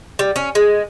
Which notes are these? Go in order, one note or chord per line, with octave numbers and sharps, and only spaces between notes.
G3
C#4
G#3